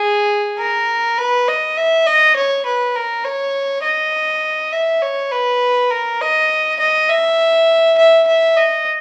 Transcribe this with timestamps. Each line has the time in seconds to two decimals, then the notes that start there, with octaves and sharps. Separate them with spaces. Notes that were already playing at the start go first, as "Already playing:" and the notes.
Already playing: G#4
0.58 A#4
1.17 B4
1.47 D#5
1.77 E5
2.06 D#5
2.36 C#5
2.65 B4
2.95 A#4
3.24 C#5
3.83 D#5
4.72 E5
5.02 C#5
5.31 B4
5.91 A#4
6.21 D#5
6.80 D#5
7.09 E5
7.97 E5
8.27 E5
8.57 D#5